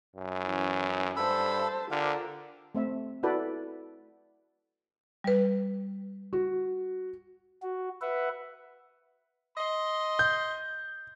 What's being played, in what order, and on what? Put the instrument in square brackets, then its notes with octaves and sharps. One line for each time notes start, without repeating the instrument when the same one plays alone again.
[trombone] F#2
[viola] E3 C#4
[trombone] G2 [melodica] A4 B5 E6 [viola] C5 A5
[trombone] D3 [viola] F4 A#4 [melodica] G4 F5
[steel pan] A3 C4 E5
E4 F#4 A4 B4 D5
[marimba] G3 B4
[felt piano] F#4
[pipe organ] F#4
B4 E5 F#5
[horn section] D#5 C6
[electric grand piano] G6